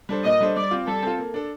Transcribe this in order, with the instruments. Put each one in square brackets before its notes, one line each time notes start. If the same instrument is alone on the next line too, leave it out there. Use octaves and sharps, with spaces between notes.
[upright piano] G3 D4 A4 C5
[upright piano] A#2 [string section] D#5
[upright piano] G3 D4 A4 C5
[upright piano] G3 [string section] D5
[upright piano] C4 F4
[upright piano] G3 [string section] A4
[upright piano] C4 F4
A#3
D4 A4